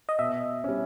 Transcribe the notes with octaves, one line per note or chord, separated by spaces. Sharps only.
D#5
B2 E5
G3 C#4